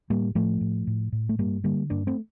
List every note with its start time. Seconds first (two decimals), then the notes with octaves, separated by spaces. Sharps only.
0.10 A2 G3 A#3
0.35 A2 F3 A3
0.61 A2
0.87 A2
1.12 A2
1.29 A3
1.39 G2 G3 A#3
1.64 D3 G3 A#3
1.90 G2 A#3 D4
2.07 A3 C4